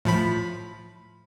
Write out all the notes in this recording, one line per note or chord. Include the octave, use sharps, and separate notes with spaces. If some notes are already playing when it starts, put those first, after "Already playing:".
A2 F3 B5